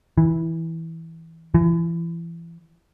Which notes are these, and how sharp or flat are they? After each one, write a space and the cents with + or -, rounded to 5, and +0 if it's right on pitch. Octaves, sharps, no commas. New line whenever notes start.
E3 -10
E3 +30